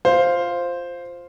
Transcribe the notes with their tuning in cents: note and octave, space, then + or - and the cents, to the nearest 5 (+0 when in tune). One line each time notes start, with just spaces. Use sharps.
F4 +0 C5 +0 F5 +0